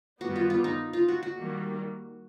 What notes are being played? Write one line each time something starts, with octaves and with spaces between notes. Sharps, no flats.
G2 D#3 G3 B3 F#4
F4
F4
D#4
F4
F#4
F#4
D#3 G3 A#3